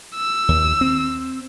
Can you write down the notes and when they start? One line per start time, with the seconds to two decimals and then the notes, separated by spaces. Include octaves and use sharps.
0.16 E6
0.48 D#2
0.81 C4